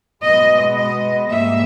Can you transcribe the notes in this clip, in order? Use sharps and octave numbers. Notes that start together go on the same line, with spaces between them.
B2 G#3 B3 D#5
D#5
G#2 G3 A#3 E5